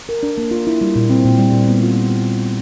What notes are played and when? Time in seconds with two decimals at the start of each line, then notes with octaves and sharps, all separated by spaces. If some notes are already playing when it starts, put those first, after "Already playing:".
0.09 A#4
0.23 D4
0.38 A#3
0.51 F4
0.67 E4
0.81 G3
0.96 A#2
1.10 C4
1.25 A#2
1.39 G3
1.53 A#2
1.68 B3
1.83 F4